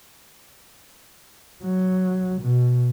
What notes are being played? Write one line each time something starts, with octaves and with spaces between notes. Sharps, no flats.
F#3
B2